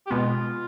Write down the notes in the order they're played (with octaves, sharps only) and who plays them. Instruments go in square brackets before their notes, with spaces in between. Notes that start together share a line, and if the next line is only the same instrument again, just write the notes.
[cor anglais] G4
[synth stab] B2 G#3 B3 [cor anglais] F4